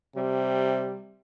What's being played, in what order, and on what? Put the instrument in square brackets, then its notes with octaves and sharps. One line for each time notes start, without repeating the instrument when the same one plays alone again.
[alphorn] C3 [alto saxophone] G3